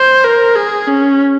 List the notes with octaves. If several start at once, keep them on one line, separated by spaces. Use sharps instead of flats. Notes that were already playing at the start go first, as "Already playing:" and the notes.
Already playing: C5
A#4
G#4
C#4